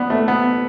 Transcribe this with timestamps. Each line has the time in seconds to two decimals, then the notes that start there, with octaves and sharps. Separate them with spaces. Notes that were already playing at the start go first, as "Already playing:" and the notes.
Already playing: B3 D4
0.10 A3
0.28 B3